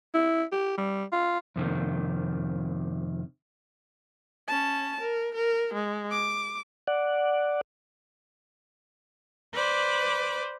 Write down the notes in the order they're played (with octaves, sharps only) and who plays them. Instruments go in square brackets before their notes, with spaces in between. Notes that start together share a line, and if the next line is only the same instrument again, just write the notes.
[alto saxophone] E4
G4
G3
F4
[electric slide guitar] F2 C3 D#3
[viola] C#4 A5
A#4
A#4
G#3
D6
[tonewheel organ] D5 F#5
[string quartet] B4 C5 D5 D6